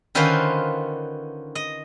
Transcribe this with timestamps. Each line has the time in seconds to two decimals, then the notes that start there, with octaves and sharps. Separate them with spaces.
0.15 D3 D#3 C#4 F4 B4 C5
1.55 D#5